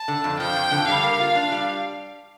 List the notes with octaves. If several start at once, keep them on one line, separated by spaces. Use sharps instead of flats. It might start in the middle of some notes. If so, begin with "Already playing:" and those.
Already playing: A5
D3
F2
F3 G5
F2
D3
G3 F5
A#3
F4
D4
G3